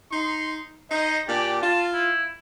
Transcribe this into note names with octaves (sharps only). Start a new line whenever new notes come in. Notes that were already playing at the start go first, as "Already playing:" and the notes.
D#4 C6
D#4 C5 D#5
A#2 D4 G4 D5
F4 A5
E4